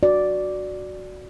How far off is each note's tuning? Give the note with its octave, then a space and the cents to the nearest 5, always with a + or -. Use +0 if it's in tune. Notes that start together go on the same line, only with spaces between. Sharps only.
F#4 +0 D5 +0